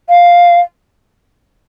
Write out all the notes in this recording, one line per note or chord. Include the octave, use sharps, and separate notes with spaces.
F5